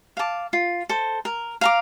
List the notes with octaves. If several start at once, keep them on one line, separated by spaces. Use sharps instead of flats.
F5 A5 D6
F4
A4 C5
A#4
F5 A#5 D6